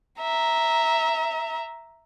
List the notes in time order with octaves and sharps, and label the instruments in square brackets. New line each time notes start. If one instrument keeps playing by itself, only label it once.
[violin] E5 A#5